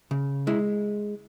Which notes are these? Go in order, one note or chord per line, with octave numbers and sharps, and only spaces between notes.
C#3
G#3 E4